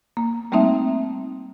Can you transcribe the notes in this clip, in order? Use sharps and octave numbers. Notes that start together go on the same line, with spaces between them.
A#3
G3 A3 A#3 C4 D#4 E5